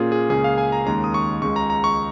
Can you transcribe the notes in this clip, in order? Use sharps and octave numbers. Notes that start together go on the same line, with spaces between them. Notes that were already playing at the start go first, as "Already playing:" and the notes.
Already playing: A#2 A#3 C#4 F4 G#4
G#4
C#2 C#3 A#3 C#4 G#4
F5
G#5
A#5
D#2 D#3 G#3 C#4 A#5
D#6
C#6
C#2 C#3 G#3 C#6
A#5
A#5
C#6